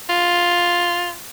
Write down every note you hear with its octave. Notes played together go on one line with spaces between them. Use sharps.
F4